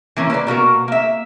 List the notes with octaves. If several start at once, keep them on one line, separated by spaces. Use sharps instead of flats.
E3 A#3 C#4
A#3 B4 C5 D5
B2 A#3 F#4 A#4
A#3 E5